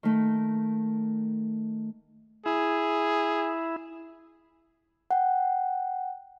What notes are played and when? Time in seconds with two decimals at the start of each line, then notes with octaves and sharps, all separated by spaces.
0.03 D#3 A3
2.46 E4 G#4
5.11 F#5 G5